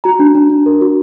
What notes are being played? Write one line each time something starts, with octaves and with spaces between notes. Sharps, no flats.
F#4 A#5
D4
D4
D4
A#4
F#4